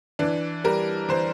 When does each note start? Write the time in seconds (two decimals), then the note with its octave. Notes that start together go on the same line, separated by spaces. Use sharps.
0.19 E3 D4
0.64 G3 A#4
1.09 E3 C5